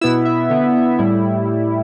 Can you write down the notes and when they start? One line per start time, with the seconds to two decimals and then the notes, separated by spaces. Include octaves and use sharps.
0.01 B2 B3 E4 E6
0.25 E5
0.50 D3 B3 E4
0.99 A2 G3 E4